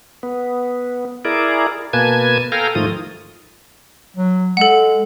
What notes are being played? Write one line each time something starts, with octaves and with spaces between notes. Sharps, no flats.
B3
E4 G#4 A#4 D5
B2 A#3 B4 G#5 A5 G#6
A4 F5 G5 G#5 A#5
G#2 D#3 F3 A3 F4 D#6
F#3
G#3 A4 F#5